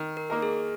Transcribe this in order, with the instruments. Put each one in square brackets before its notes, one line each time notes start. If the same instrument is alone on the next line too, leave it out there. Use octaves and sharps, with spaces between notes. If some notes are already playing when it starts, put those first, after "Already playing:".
Already playing: [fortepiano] D#3
[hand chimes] A#4
[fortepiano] A#3 D#4 A#4
[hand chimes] G#4